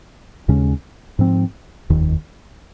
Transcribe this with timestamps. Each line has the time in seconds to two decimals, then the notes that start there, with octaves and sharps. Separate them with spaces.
0.48 D#2 C#3 G#3 C#4
1.19 G#2 F3 C4
1.90 F1 D#2 D#3